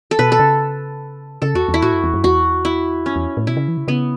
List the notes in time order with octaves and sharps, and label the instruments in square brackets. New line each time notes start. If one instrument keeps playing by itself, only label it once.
[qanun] A4
[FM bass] B2 [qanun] B4
[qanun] A4
[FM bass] C#3
[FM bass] C#3 [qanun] A4
[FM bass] E2 [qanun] F#4
[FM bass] E2
[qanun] E4
[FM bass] A2 [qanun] F#4
[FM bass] F#2
E2
F#2
[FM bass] E2 [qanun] F#4
[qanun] E4
[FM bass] F#2 [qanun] C#4
[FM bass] E2
A2
[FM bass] B2 [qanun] E4
[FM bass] C#3
E3
C#3
[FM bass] C#3 [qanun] B3